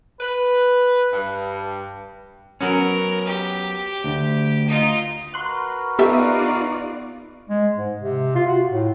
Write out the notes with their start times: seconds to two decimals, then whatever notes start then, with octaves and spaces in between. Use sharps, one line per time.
0.21 B4
1.13 G2
2.61 F#3 B3 C#4 A#4 A#5
3.26 G4
4.04 D2
4.68 D#4 F4
5.34 F#4 A#4 B4 C6 F#6
5.99 B3 D#4 F4 G4 A4 D5 E5
7.50 G#3
7.77 G#2
8.01 C3
8.35 F4
8.48 F#4
8.70 A2